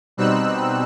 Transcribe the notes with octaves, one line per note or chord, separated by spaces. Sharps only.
B2 G3 C4 D#4 E6 F#6